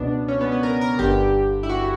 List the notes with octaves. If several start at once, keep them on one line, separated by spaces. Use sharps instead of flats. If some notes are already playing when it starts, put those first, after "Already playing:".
Already playing: C#2 B2 B3 D4
C#4
B3
B3
A#4
A#4
G1 G2 D3 G4
E4
F#4